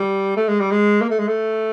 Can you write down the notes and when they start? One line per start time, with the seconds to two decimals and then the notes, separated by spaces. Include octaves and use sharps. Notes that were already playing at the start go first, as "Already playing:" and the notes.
Already playing: G3
0.36 A3
0.48 G#3
0.60 G3
0.71 G#3
1.01 A#3
1.10 A3
1.19 G#3
1.28 A3